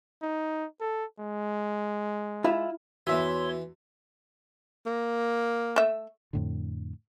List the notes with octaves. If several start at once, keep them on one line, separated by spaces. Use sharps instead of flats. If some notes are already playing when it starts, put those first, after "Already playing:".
D#4
A4
G#3
E4 F4 E5
E2 E3 F#4 C#5 E5 C6 E6
A#3
A3 E5
F2 A2 D3